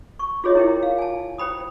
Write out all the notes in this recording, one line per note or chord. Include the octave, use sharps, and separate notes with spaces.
C#6
F4 G#4 C#5 D#5 E5
E4 A#4 G5
F5
G#5 A5
C5 G5 B5 D#6